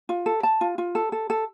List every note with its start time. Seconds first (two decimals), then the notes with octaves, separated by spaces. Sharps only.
0.09 F4
0.26 A4
0.43 A5
0.61 F4
0.78 F4
0.95 A4
1.12 A4
1.30 A4